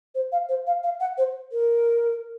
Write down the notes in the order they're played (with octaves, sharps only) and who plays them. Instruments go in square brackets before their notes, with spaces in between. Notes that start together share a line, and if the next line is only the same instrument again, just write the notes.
[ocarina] C5
F5
C5
F5
F5
F#5
C5
A#4